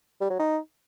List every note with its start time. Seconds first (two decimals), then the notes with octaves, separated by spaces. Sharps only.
0.21 G3
0.30 F#3
0.39 D#4